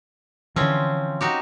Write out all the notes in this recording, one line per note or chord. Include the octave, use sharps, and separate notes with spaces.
D3 E3 F3 C4 C#4
D#4 F#4 G4